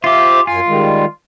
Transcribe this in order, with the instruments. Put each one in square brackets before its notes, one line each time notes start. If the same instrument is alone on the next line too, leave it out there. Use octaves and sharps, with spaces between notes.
[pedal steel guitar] F4 G4 [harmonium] C5 E5 F5
[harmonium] F#2 G#5 [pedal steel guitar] F4
[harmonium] D#3 G3 G#3